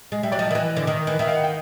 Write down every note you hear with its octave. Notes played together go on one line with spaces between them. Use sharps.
G#3
G3 E5
F#3 D5
F3 D#5
E5
D#3
E3 D#5
D3
D#3
E3
D#3 E5
F5
F#5
G5